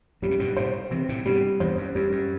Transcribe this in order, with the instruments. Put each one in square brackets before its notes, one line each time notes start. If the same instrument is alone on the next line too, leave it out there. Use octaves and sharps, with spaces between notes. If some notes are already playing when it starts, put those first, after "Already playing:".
[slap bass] F#2 A2 [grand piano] G3
[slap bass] C3
G2 B2
[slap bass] A2 C3 [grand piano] C5
[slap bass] C3 E3 [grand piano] C4
[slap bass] A2 C3
[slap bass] G2 B2 [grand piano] G3
[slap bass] E2 G2 [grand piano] C5
[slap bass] F#2
[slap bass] F#2 [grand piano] G3
[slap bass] F#2